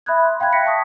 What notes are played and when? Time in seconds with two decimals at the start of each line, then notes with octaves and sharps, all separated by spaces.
0.06 E5 B5 D#6 F#6 G#6
0.23 C6
0.40 F5 G5 B5 F#6 G#6
0.53 E5 G5 A#6 B6 C#7
0.66 A5 C#6 D#6 B6